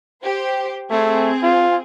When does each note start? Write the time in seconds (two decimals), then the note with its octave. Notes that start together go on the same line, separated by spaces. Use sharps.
0.23 G4 C5
0.91 A3 C4 G#4
1.43 F4